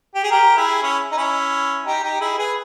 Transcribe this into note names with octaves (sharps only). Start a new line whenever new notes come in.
G4
G#4
G4 A#4
E4 G#4
C#4 E4
D#4
C#4 E4
D#4 G4
D#4 G4
E4 G#4
G#4 B4